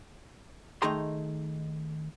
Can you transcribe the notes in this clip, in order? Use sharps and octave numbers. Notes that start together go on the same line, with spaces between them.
D#3 A3 D#4 G#4 A#5 C6